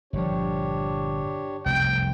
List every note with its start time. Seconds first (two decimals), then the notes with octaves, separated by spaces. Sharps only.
0.13 G1 A#2 F3 D4 G4 C#5
1.66 F1 C2 F#2 G5